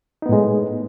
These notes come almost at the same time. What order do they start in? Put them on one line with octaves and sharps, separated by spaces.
D#4 B3 A2 G#3